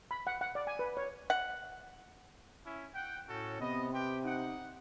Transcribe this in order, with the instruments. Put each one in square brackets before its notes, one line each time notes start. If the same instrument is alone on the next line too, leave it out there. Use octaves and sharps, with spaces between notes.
[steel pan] B5
F#5
F#5
D5
G#5
B4
C#5
[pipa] F#5
[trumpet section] C#4 E4
F#5 G5
[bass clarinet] A2 [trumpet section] C#4 F#4 A4
[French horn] C3 [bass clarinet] B3 [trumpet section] D#5
[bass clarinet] C4 [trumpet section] G4 B4 G5
[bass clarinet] D#4 [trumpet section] F#5